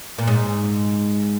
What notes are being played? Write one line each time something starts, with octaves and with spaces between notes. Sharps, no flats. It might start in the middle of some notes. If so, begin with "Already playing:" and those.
A#2
G#2